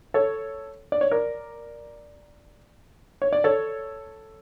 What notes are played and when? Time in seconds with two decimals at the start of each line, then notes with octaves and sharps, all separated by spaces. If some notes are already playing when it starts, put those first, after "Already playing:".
0.14 A4 C#5
0.92 D5
1.01 C#5
1.11 A#4 D5
3.22 C#5
3.33 D5
3.44 A4 C#5